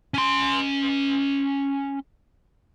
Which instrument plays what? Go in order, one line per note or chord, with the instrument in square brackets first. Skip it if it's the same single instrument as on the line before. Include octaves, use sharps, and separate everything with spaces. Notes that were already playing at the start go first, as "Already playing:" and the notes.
[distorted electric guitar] C#4 C6